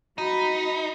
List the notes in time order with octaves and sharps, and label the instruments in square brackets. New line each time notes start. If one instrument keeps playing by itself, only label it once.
[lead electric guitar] D#4 [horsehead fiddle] F#4 B5